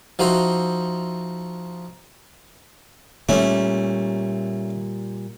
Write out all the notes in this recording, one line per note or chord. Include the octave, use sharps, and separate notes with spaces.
F3 D#4 F#4 C5 E5
A#2 G3 A3 C#4